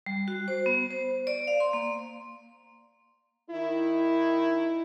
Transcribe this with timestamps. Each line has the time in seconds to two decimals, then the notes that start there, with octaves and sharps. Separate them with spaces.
0.06 G3
0.28 F#4
0.48 C5
0.66 B3
0.91 C5
1.27 D5
1.47 F5
1.60 C6
1.73 A#3
3.50 D#3 D#4 E4